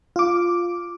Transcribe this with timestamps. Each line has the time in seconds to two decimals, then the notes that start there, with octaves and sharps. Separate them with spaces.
0.16 F4 D6